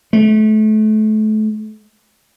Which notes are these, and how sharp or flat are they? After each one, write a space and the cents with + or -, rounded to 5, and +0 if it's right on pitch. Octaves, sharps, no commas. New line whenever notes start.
A3 -30